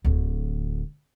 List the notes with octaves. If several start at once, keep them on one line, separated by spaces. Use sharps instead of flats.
D1 D2